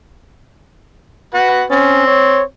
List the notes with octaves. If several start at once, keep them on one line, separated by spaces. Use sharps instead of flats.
F#4 B4 F#5
C4 C#4
C#5